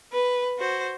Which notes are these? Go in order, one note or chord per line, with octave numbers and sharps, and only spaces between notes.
B4
F#4 C5